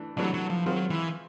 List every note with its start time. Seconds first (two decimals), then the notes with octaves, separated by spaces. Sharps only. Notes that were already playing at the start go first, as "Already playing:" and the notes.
Already playing: E3 A3 D4
0.17 C3 E3 F#3 A3 D4
0.34 F#3
0.50 F3
0.66 D#3 F#3 G#3 C4 F4
0.90 E3